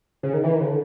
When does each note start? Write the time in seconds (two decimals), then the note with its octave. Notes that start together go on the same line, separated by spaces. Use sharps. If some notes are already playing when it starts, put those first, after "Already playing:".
0.23 C#3
0.34 D#3
0.44 E3
0.54 D#3
0.60 C#3
0.65 D3